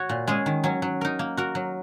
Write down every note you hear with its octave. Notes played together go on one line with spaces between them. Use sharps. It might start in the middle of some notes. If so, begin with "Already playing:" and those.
Already playing: F#4 C#5
A#2
G#3 C#4 G#4
D#3
F#3 C#4
F#3
D#4 A#4
A#3
F#4 A#4
F#3